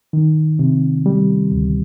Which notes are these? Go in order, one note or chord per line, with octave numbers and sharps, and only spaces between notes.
D#3
C3
G3
D2